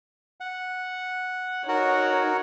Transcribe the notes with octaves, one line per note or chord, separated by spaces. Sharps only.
F#5
D#4 F#4 A#4 C#5 F#5